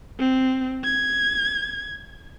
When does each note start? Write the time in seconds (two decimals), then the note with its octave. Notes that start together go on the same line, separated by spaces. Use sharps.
0.19 C4
0.84 G#6